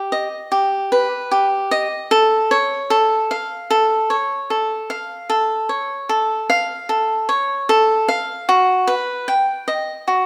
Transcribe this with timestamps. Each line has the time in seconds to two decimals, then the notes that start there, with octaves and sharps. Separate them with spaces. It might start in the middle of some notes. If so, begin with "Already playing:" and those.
Already playing: G4
0.12 D#5
0.52 G4
0.92 B4
1.31 G4
1.71 D#5
2.11 A4
2.51 C#5
2.90 A4
3.31 F5
3.70 A4
4.10 C#5
4.50 A4
4.90 F5
5.30 A4
5.69 C#5
6.09 A4
6.50 F5
6.89 A4
7.29 C#5
7.69 A4
8.08 F5
8.49 F#4
8.87 B4
9.28 G5
9.68 D#5
10.08 F#4